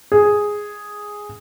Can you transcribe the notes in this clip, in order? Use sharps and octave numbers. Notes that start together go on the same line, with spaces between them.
G#4